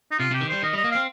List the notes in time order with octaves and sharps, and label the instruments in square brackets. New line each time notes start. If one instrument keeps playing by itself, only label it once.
[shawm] D#4
[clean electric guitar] C3 [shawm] F4
[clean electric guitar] C3 [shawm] G4
[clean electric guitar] D#3
[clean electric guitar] G3 [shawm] C5
[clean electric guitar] D#3 [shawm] D#5
[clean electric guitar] G3 [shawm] D#5
[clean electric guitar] A#3
[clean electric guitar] C4 [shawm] F5